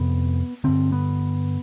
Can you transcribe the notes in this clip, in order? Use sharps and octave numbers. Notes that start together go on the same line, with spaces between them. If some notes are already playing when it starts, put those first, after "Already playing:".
Already playing: F2 C3 B3
G2 D3 C4
B3